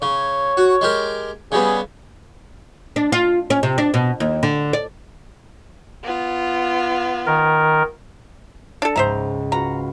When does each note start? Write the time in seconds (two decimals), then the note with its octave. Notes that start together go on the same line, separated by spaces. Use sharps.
0.02 C#3 C#5
0.57 F#4
0.81 G#3 G4 A#4
1.52 C#3 G3 B3 G#4
2.96 D4
3.12 F4
3.50 C#4
3.63 C3
3.78 D4
3.94 B2
4.20 D#2
4.43 D3
4.73 D5
6.03 B3 F4
7.26 D#3 A#4
8.82 D4 A4
8.96 C#2 G#2 G#3 C5 E5 A#5
9.52 F4 F#4 B4 A#5